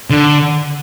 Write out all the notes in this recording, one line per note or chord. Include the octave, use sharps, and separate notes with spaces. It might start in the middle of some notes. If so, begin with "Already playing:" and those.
D3